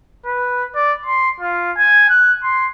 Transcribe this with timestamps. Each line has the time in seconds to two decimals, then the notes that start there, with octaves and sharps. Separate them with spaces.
0.26 B4
0.75 D5
1.06 C6
1.40 F4
1.78 G#5
2.10 F#6
2.43 C6